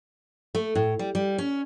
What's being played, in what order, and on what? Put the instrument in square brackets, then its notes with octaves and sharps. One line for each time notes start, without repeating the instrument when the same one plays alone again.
[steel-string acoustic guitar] A3
A2
G3
G3
C#4